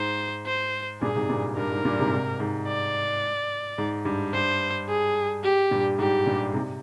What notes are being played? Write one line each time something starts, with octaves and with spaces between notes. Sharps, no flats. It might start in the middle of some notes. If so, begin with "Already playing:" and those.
Already playing: G#2 C5
C5
G2 A#2 G#4
G#2 C3
G2 A#2
G2 A#4
G#2
G2 A#2
G#2 C3
G#2 C3
G#2
D5
G#2
G2
G2 C5
G#4
G4
G2 A#2
G#2 G4
G2 A#2
G#2 C3